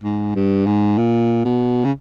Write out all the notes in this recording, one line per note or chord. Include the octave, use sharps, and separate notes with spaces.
G#2
G2
G#2
A#2
B2
C#3